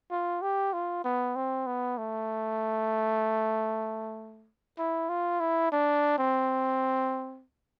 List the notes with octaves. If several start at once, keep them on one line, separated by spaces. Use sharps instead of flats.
F4
G4
F4
B3
C4
B3
A3
E4
F4
E4
D4
C4